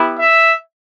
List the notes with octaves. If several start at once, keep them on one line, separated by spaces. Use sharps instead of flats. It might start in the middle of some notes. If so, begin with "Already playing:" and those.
Already playing: B3 E4 G4
E5